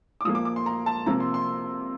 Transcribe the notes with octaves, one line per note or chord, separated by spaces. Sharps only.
D6
A#2 F3 A#3 D#6
D6
D6
C6
A#5
A5
C3 F3 A#3 A#5
C6
C6